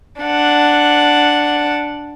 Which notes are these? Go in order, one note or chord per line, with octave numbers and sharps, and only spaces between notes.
D4 F#5